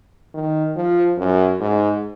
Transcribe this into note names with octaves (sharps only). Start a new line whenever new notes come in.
D#3
F3
F#2
G#2